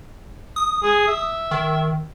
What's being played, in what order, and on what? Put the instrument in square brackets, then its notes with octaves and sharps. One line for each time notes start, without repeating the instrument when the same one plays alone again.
[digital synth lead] D#6
[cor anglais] G#4
E5
[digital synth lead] D#3